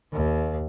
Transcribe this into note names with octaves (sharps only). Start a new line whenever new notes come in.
D#2